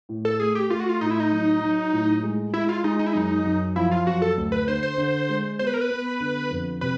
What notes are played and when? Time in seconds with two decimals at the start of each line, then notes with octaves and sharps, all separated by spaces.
0.09 A2
0.25 A4
0.40 A3 G#4
0.55 G4
0.70 A3 F4
0.80 F#4
0.89 F4
1.00 A2 D#4
1.10 E4
1.20 D#4
1.32 F#3
1.62 F#3
1.93 A2
2.23 G#3
2.54 G#3 E4
2.69 F4
2.84 G#3 D#4
2.99 D#4
3.06 E4
3.13 F#2 D#4
3.45 F#2
3.76 F3 E4
3.91 F4
4.07 F#2 F#4
4.22 A4
4.37 D2
4.52 B4
4.68 D3 C5
4.83 C5
4.98 D3
5.29 G#3
5.59 B3 C5
5.67 B4
5.74 A#4
5.81 B4
5.90 B3
6.20 D3
6.51 F2
6.81 C3 B4